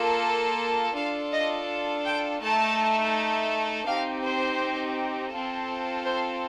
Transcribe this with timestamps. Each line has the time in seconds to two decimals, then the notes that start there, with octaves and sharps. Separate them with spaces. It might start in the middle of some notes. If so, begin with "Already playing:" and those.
Already playing: A#3 F4 A4
0.96 D4 F4 A4 F5
1.33 D#5
2.05 G5
2.42 A3 D#4 A4 A5
3.87 C4 D#4 G4 F5
4.23 C5
5.33 C4 F4 A4
6.05 C5